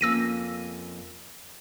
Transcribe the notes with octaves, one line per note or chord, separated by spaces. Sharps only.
F2 A#3 C#4 E6 A#6 D#7